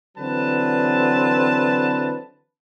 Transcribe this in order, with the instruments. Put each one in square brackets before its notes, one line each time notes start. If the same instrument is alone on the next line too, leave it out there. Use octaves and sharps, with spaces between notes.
[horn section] D3 E3 F#3 C4 B4 A5